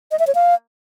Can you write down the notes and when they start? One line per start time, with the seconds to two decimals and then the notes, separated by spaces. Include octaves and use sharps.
0.11 D#5
0.19 E5
0.27 C#5
0.35 F5